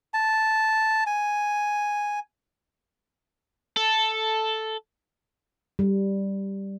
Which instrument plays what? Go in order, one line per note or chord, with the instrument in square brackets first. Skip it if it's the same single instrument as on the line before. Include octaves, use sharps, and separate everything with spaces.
[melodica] A5
G#5
[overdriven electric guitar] A4
[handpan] G3